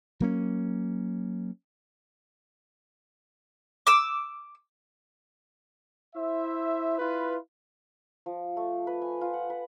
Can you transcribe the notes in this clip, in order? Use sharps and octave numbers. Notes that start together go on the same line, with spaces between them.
F#3 A#3 C#4
D6 E6
E4 C5 E5
E4 F4 B4
F3
A3
B4
G#5
F4
F#5
B4